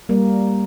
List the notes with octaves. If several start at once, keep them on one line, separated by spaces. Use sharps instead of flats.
G3 A#3